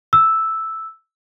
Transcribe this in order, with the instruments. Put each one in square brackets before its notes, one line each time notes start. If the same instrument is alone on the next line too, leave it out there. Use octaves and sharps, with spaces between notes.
[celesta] E6